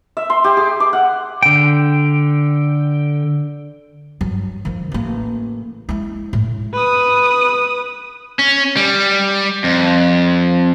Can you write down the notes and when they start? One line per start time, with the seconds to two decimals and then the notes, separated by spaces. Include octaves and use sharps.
0.17 E5
0.30 C6
0.44 G4
0.57 G#4
0.80 D6
0.93 F#5
1.43 D3 G5
4.21 G2 F#3
4.65 D#3 F3
4.92 A1 A#3
5.89 G#3 E4
6.33 A2
6.73 B4 D#6
8.39 C#4
8.77 G3
9.64 F2